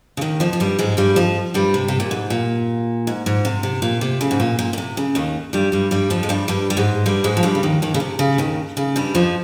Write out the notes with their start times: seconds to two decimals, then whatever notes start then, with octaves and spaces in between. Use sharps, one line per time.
0.17 C#3
0.21 D#2 D#3
0.40 F2 F3
0.53 F3
0.60 G2 G3
0.79 G#2 G#3
0.97 G2 G3
1.16 F2 F3
1.54 G2 G3
1.74 C3
1.88 C3
2.00 A#2
2.11 G#2
2.30 A#2
3.07 G#2
3.26 G#2
3.45 C3
3.63 C3
3.82 A#2
4.01 C3
4.21 C#3
4.31 G#2
4.40 A#2
4.59 A#2
4.73 A#2
4.78 C3
4.97 C#3
5.15 D#2 D#3
5.53 G2 G3
5.72 G2 G3
5.91 G2 G3
6.10 F2 F3
6.23 G#3
6.29 G2 G3
6.48 G2 G3
6.70 G3
6.77 G#2 G#3
7.06 G2 G3
7.24 G#2 G#3
7.37 F3
7.43 G2 G3
7.55 C#3
7.63 D#2 D#3
7.82 D#2 D#3
7.94 C#3
8.00 C3
8.19 C#3
8.38 D#2 D#3
8.77 C#3
8.96 G2 G3
9.15 F2 F3